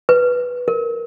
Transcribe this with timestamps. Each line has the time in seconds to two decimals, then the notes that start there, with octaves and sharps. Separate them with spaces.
0.09 B4
0.68 A#4